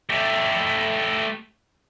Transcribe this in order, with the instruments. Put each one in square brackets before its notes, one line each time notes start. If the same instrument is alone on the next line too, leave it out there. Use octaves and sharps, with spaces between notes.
[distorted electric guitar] A3 G4